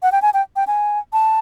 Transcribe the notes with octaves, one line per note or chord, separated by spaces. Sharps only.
F#5
G5
G#5
G5
G5
G#5
A5